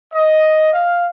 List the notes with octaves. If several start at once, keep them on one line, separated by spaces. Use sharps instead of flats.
D#5
F5